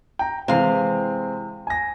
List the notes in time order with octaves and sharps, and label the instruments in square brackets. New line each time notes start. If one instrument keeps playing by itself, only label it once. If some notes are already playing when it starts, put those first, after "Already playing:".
[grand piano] G5 A#5
[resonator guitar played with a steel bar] C3 F5 [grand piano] E3 G#3 C4
[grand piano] G#5 A#6